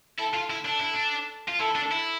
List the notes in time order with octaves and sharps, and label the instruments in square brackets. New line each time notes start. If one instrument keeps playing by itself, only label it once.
[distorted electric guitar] E4 [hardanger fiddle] A4
[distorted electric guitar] F4
E4
[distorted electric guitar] D4 [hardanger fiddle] A4
[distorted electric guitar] E4
D4
F4
[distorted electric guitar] E4 [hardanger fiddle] A4
[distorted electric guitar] D4
E4